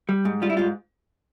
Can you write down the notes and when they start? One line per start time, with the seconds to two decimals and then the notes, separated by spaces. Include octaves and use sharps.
0.09 G3
0.25 G#2
0.42 G3 F4
0.50 E4
0.57 G#2 F4